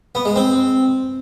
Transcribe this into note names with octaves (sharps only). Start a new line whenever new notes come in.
B3
G#3
C4